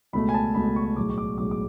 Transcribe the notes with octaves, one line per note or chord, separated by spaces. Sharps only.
C#2 B2 A3 B5
G#5
A5
C#2 B2 A3 B5
C#6
B1 A2 G#3 D6
C#6
D6
B1 A2 G#3 D6
D6